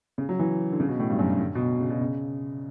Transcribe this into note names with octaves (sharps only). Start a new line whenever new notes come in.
C#3
F#3
E3
D3
C#3
B2
A2
G2
F#2
G2
D3
B2
C#3
B2
C#3